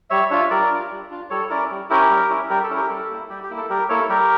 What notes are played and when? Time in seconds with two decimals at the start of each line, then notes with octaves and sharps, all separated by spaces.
0.10 G3 C#5 E5
0.30 D4 F4 C#5 E5
0.50 G3 A#4 D5
0.71 D4 F4
0.91 G3
1.10 D4 F4
1.30 G3 A4 C#5
1.50 C#4 E4 A#4 D5
1.70 G3
1.90 C#4 E4 G4 A#4
2.10 G3
2.30 C#4 E4
2.50 G3 G4 A#4
2.64 A4
2.70 C#4 E4
2.77 G4 A#4
2.90 G3 A4
3.10 A#3 E4
3.30 G3 G4
3.43 G4
3.50 A#3 E4
3.57 A4
3.69 G3 G4 A#4
3.89 A#3 E4 A4 C#5
4.09 G3 G4 A#4